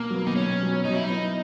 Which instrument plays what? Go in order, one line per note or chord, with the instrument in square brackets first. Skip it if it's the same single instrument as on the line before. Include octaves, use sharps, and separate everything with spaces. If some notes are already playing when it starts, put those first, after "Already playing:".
Already playing: [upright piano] B2 [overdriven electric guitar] A#3
[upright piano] F#3 B3
[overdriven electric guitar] D#4
[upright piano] B2 [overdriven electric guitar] C#4
[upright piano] F#3 B3
[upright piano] F#3 [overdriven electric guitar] D#4
[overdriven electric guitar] E4
D#4
[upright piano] B3 E4